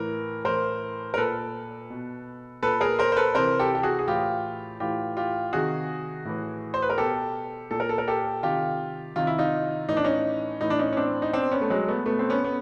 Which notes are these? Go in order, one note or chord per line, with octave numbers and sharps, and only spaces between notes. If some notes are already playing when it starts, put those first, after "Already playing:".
Already playing: A2 E3 A#4
A2 E3 A#4 C5
A#4
A#2 A4 B4
B2
A#2 A4 B4
G#4 A#4
A#4 C5
C5
A4 B4
C3 E3 A#4 C5
G4 A4
G4
F#4 G#4
G#4
A2 E3 F4 G4
A2 E3 F4 G4
F4 G4
C3 D#3 F#4 G#4
A2 E3
C5
B4
A#4
B2 G4 A4
A#2 A4
A#4
A4
A#4
G4 A4
C3 D#3 F4 G4
C3 D#3 F4
E4
D#4 F4
A2 E3 D#4
D4
C#4 D#4
A2 E3 D#4
D4
C#4 D#4
C#4
C4 D4
D#4
B2 C4 D4
B3 C#4
A3
F#3 G#3
A3 B3
B2 A3 B3
C4
B3 C#4
B3